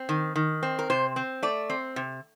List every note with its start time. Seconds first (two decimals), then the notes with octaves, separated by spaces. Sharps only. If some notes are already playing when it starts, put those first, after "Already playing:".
Already playing: C4
0.09 D#3
0.36 D#3
0.63 C4
0.79 A#4
0.90 C3 C5
1.16 C4
1.43 A3 D5
1.70 C4
1.96 C3